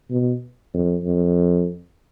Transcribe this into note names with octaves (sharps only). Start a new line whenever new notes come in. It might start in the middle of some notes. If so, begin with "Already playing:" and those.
B2
F2
F2